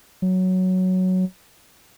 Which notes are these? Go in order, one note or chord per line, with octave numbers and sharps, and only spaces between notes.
F#3